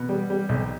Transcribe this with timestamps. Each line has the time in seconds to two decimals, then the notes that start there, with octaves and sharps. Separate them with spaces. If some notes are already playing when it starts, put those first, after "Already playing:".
Already playing: B2 B3
0.09 G3
0.30 G3
0.49 B1